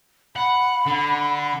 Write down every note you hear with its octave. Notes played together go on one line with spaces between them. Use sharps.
F#5 B5
D3